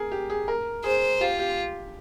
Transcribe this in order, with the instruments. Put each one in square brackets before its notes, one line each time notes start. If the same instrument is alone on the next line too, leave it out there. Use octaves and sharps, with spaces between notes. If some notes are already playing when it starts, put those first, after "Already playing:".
Already playing: [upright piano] G#4 A#4
G4
G#4
A#4
[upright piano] G#4 [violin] C5
[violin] F4 [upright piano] G4
[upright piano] G4